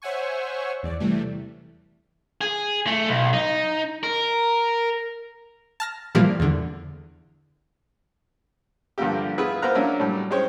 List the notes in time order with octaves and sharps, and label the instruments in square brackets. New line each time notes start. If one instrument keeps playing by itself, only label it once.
[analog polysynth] C5 C#5 E5 F#5 G#5 C#6
E2 D5
C3 E3 G3 A3
[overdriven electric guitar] G#4
A3
B1
D#4
A#4
[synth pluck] A5 F6 A#6
A#2 E3 F3 G3 A#3
E2 D3
[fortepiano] G2 D3 F3 A#3 G4
B3 E4 F4 G#4 B4
A#3 B3 A#4 C5 A#5 F#6
F#3 A#3 C#4 D4 E5
A2 F#3 G3
G#3 C#4 C5 C#5 G5